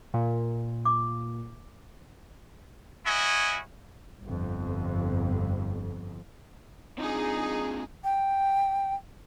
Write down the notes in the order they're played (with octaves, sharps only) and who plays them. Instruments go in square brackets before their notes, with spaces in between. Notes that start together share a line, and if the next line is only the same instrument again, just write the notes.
[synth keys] A#2
[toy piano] D6
[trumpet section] C#4 E4 F#4 D#5 G#5
[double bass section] G1 F2
[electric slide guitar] C4 D4 F4 [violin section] D#4 G#4
[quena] G5